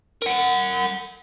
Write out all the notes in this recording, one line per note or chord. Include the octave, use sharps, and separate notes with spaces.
A#4 F#5